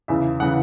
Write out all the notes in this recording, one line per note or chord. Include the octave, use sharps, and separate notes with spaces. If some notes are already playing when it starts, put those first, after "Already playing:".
E2 C#3 E3 E5
C#3 E3 F#5